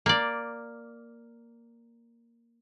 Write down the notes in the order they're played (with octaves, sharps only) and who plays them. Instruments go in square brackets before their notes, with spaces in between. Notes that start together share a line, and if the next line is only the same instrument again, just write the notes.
[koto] A#3 D5